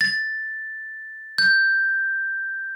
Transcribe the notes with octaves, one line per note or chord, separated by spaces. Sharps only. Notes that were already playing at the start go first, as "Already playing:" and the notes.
A6
G6